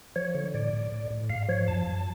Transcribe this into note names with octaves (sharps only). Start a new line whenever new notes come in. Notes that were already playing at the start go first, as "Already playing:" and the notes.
F3 C#5
D3 C#5
A2 D5
A2
A2
A2
G#2 F5
F3 C#5
F#2 A5
F#2